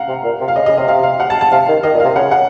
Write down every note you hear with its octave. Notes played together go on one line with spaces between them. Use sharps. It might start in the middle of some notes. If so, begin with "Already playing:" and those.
Already playing: F5 F#5 A#5
C3
A#2
C3
F5
C#3 D#5
C#3 D#5
C3 D#5
C3 F5
F5
F#5
A5
A5
C3 F5
D#3
D#3 D#5
A#2
C3 F5
C#3 F#5
F#5